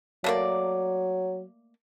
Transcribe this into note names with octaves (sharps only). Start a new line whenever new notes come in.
F#3 A3 A#3 D5